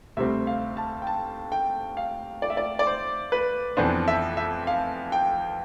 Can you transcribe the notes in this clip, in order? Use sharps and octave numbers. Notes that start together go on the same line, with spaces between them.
D2 C3 G3 C4 E5
F5
A5
G5
A5
G5
F5
D5
E5
D5
D5
C5
B4
F2 E3 B3 D4 C5
E5
E5
F5
G5